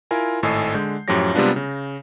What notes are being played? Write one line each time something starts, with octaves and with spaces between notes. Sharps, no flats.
E4 F4 A#4 G#5
G#1 A2 A4 D#5 G#5 C7
D3 G#3 G6
F#2 A2 F3 G4 C#5 A#6
C3 G3 G#3 B3 D4 F4
C#3